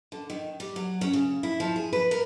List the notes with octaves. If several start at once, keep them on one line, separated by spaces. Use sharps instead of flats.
D3
D#3
G3
F#3
C#4
C#3
E4
F3
G#4
B4
A#4